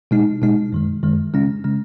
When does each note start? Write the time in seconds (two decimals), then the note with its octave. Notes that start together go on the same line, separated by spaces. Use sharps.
0.11 B2 G#3 D#4
0.42 B2 G#3 D#4
0.73 F#2 D#3 G#3
1.03 F#2 D#3 G#3
1.34 C#3 G#3 C#4
1.64 C#3 G#3 C#4